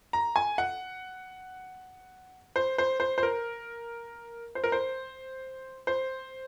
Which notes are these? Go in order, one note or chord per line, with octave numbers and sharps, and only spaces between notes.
A#5
G#5
F#5
C5
C5
C5
C5
A#4
C5
A#4
C5
C5